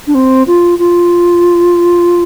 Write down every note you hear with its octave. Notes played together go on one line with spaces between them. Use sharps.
D4
C4
F4
F4